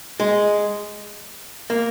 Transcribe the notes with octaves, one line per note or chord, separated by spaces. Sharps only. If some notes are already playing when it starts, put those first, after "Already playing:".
G#3
A#3